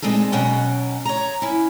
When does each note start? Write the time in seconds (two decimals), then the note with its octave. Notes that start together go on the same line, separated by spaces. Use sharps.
0.02 A#2 G#3 C4 D#4 A4
0.32 B2 F#3 C#4 F#5 G5
1.05 C#5 A#5
1.42 C#4 E4